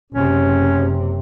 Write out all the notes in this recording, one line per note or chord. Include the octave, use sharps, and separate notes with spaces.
F#1 C3 C#4